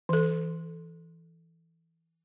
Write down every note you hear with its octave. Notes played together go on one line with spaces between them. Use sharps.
E3 A4